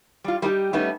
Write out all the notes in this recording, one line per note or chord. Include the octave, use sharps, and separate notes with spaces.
G3 F4
G3 A3 D#4 G4
G3 A3 B3 C#4 D#4